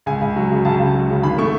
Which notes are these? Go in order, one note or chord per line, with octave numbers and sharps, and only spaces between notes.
C#2 G#5
C#2
F#3
C#3
C#2 A5
C#2
F#3
C#3
G#1 B5
A3 C#6